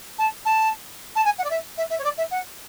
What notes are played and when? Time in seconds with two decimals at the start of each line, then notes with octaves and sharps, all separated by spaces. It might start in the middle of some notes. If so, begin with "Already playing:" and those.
0.18 A5
0.45 A5
1.15 A5
1.25 G#5
1.38 F#5
1.44 D5
1.50 E5
1.77 E5
1.90 E5
1.99 C#5
2.04 D5
2.17 E5
2.31 F#5